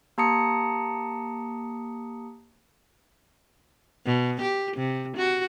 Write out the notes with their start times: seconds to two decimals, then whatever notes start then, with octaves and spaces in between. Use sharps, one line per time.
0.18 A#3 G4 A5 A#5 D#6 C#7
4.06 B2
4.41 G4
4.77 C3
5.17 F#4